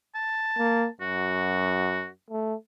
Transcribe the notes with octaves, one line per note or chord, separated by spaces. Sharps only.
A5
A#3
F#2 F#4
A3